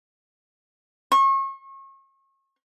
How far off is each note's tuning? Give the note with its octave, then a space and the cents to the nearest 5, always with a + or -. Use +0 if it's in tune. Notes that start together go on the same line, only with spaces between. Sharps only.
C#6 -35